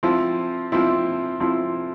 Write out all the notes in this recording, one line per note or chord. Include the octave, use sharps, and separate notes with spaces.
F3 C4 E4
F3 C4 E4
F3 C4 E4